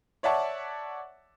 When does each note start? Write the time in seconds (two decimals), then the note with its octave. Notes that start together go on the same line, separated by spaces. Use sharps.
0.23 C#5 D5 E5 F#5 A5 C#6